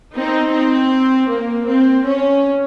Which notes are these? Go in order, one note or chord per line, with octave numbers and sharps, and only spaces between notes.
C4 D#4
C4
A#3
C4
C#4